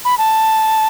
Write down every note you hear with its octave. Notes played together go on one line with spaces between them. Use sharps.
B5
A5